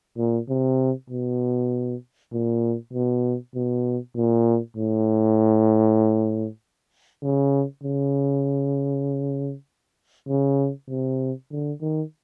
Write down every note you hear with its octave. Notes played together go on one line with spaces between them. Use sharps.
A#2
C3
B2
A#2
B2
B2
A#2
A2
C#3
C#3
C#3
C3
D3
D#3